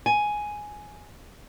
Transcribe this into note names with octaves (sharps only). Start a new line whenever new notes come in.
G#5